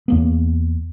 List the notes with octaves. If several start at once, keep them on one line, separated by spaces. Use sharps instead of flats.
E2 A#3 B3